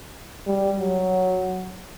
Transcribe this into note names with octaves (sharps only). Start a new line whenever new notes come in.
G3
F#3